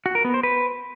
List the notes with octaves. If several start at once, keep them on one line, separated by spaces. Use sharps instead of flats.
F#4
A#4
B3
C5
B4